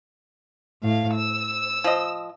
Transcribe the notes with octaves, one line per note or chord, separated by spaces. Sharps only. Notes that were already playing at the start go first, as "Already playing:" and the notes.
A2 F5
E6
F3 D#5